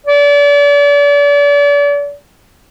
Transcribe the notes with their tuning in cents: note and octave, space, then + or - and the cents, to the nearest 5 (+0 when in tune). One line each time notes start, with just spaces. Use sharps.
D5 -40